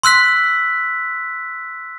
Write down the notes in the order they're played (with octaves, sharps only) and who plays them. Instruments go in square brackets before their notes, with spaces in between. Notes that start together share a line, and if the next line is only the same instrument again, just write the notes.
[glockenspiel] C6 E6 F#6 B6